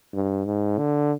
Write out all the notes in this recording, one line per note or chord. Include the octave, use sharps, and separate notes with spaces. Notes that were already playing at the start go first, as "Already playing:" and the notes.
G2
G#2
D3